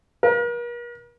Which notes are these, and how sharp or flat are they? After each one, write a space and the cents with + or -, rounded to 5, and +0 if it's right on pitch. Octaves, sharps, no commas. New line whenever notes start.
A#4 +45